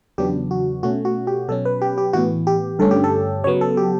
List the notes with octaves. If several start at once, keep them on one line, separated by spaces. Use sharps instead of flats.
E2 C#3 F#3 B3 D4 G4
F#4
B2 A3 C#4 F#4
F#4
G4
B2 F#3 C#4 A4
B4
G4
G4
A2 E3 B3 F#4
G4
G2 D3 A3 C#4 A4
G4
A4
C#3 F#3 B3 C#5
A4
G4